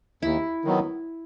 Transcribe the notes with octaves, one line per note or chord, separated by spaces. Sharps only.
D#2 E4
D#3 F#3 B3